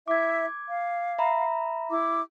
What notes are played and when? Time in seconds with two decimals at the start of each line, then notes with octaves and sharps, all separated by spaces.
0.08 E4 E5 D6 G#6
0.69 F5
1.19 E5 A#5 B5
1.91 E4 D6